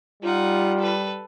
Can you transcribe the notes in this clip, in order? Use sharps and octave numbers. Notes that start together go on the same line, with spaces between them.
G3 D#4 F4 F#5
A4 B4